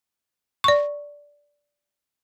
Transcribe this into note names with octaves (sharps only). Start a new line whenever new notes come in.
D5 C#6